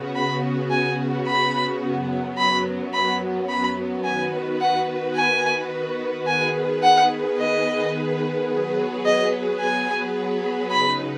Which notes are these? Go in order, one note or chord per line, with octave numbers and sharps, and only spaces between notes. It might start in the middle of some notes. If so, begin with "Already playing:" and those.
Already playing: C#3 B3 F#4
B5
G#5
B5
F#2 F#3 B3
B5
B5
B5
D#3 B3 F#4 B4 G#5
F#5
G#5
D#3 B3 G#4 B4 G#5
F#5
D#5
F#3 B3 G#4 B4
D#5
G#5
C#3 F#3 D#4 B4 B5